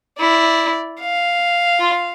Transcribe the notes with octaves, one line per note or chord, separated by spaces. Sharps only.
E4 D5
F5
F4